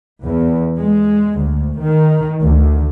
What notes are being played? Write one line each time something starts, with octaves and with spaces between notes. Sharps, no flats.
E2
G#3
D2
D#3
D2